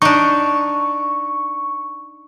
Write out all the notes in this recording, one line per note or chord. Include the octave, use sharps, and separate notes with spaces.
D4 D#4 C#6